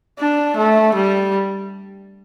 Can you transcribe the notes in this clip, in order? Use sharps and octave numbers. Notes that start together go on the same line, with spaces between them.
D4
A3
G3